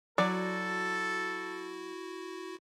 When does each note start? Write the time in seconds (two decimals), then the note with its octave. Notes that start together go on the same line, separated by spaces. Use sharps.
0.18 F#3 E4 F#4 A4 D5